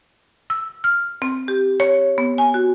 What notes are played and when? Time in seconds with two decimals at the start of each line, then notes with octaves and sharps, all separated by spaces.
0.50 E6
0.84 F6
1.22 C4
1.48 G4
1.80 C#5
2.18 B3
2.38 G#5
2.54 F#4